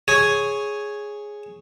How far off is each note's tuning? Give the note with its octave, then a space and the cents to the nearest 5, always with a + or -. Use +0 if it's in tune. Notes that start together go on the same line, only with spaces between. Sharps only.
G#4 +0 C#5 +0 G#5 +0